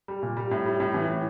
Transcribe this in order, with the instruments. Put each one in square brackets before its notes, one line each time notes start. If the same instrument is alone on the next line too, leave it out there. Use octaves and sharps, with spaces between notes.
[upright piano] G3
A#2
G3
A2
G3
A2
E3
A2